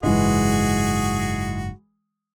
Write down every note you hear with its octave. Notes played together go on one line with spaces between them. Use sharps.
F#1 G#2 E3 G#3 F#4 G#4